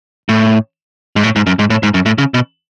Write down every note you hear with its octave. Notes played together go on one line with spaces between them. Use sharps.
A2
G#2
A2
G#2
F#2
G#2
A2
G#2
F#2
A2
C#3
B2